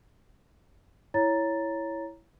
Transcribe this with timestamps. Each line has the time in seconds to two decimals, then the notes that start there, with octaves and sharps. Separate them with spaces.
1.14 E4 C#5 A#5 A6